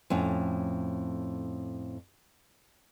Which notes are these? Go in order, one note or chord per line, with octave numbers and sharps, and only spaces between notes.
F2 A2 C#4